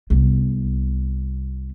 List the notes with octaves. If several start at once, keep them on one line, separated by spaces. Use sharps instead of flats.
C2 B3